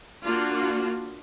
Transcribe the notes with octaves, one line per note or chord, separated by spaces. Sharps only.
A#3 D4 F4 F#4